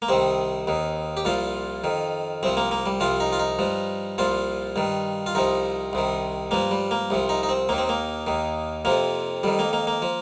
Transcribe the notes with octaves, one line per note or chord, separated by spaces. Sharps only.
A#3
C2 C3 D#3 C4
D#2 D#3
G4
C2 A#2 F3 F4
F2 D#3
C2 C3 F3 C4
A#3
A#3
G3
C2 C3 F3 F4
D#4
F4
D#4
G2 F3
C2 A#2 F3 F4
G2 D#3
F4
C2 C3 F3 D#4
C2 C3 D#3
G2 F3 A#3
G3
A#3
C2 C3 F3
D#4
D#4
C4
D#2 D#3 A#3
C4
A#3
D#2 D#3
F2 C3 F3 A#3
F2 D#3 G3
A#3
A#3
A#3
F3